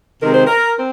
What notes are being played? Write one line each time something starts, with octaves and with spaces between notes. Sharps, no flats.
C3 D#3 G#3 C4 A#4
C5
A#4
C4